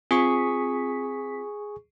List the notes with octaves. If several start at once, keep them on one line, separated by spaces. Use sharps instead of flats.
C4 F4 G#4 C#6 B6